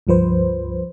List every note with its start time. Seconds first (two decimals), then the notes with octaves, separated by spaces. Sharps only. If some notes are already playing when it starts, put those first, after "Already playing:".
0.07 C#2 G2 F3 B4 C5